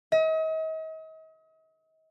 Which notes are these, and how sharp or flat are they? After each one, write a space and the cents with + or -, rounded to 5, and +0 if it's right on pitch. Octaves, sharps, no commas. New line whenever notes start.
D#5 +40